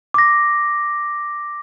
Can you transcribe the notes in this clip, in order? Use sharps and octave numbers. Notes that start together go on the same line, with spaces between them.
D6 A#6